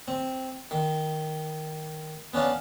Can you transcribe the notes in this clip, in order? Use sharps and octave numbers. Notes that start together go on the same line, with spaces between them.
C4
D#3
B3 C#4 D4 F5